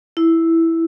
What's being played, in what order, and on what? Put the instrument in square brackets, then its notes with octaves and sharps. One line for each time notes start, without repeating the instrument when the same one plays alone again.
[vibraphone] E4